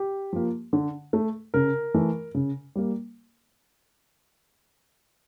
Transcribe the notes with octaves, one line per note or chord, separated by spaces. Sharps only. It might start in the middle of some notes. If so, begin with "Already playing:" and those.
Already playing: G4
F3 A#3
D3
A3
C#3 A#4
E3 A3
C#3
G3 A#3